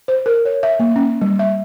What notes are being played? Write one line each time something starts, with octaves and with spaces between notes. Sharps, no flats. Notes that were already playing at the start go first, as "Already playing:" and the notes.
C5
A#4
C#5
E5
A#3
C#4
G3
E5